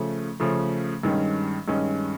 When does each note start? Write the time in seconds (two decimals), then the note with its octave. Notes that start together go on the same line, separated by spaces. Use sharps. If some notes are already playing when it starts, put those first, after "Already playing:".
Already playing: C#3 F3 A3
0.40 C#3 F3 A3
1.03 G2 D#3 G#3 C#4
1.68 G2 D#3 G#3 C#4